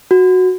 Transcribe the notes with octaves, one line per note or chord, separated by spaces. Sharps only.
F#4